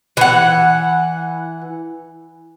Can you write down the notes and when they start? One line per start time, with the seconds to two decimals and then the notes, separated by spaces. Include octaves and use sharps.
0.17 E3 F#5